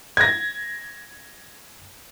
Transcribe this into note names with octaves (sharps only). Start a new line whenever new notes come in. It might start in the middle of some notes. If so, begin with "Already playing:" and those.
G#6 A#6